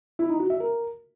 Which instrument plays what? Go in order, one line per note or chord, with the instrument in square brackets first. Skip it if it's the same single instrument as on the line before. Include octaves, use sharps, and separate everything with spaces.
[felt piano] E4
D#4
F#4
E5
A#4